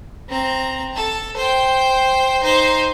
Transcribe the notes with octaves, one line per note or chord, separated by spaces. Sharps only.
C4 A#5
A4 A5
C5 G5
D#4 C5